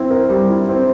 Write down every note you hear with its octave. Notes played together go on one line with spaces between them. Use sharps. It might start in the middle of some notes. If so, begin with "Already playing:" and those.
Already playing: C4 E4
A#4
G3
E4
C4